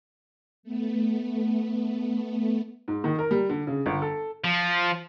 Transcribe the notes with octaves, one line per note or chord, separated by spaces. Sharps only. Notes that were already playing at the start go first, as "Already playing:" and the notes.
A3 B3
G#2
D#3
A#4
G3
D3
C#3
G1
A4
F3